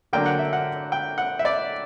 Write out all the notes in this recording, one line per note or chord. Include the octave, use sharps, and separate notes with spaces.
D3 F#3 A#3 D4 G5
F#5
E5
F#5
G5
F#5
E5
D5